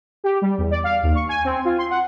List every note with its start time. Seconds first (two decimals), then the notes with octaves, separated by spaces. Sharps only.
0.24 G4
0.42 G3
0.58 E2
0.71 D5
0.84 F5
1.03 D#2
1.15 C#6
1.29 G#5
1.45 C4
1.65 F4
1.78 C6
1.90 F#5